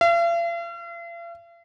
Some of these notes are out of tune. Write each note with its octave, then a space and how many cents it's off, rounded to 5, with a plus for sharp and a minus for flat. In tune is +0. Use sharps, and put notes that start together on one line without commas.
F5 -45